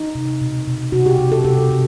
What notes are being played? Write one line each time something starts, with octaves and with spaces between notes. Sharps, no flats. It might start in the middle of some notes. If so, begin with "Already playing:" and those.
Already playing: D#4
C3
B2
B2
C3 F#4
G4
C3
A4
C3 G4
C3